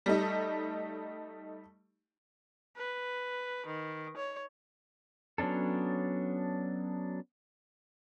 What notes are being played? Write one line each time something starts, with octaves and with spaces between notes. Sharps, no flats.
G3 A3 D#4
B4
D#3
C#5
F#3 B3 C#4 D4 A4